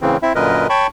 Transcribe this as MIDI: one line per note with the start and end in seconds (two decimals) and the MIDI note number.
0.01 0.17 45
0.01 0.17 49
0.01 0.17 52
0.01 0.17 60
0.23 0.33 60
0.23 0.33 64
0.23 0.33 76
0.35 0.67 42
0.35 0.67 46
0.35 0.67 50
0.35 0.67 70
0.35 0.67 71
0.35 0.67 75
0.70 0.87 73
0.70 0.87 79
0.70 0.87 81
0.70 0.87 83
0.70 0.87 85